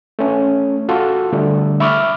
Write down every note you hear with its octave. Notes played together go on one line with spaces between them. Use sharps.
A3 C#4
F4 F#4 A4
D3 G3 A3
E5 B5 C#6 D6 E6 F6